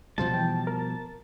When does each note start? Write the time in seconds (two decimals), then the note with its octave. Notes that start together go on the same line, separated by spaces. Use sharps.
0.18 B2 F3 G3 F4 C5 A5
0.34 E3 G5
0.67 A#4